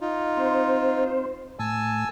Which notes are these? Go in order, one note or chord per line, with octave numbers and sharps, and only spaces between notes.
D#4 F4
C4 C5
A2 G#5 A5 E6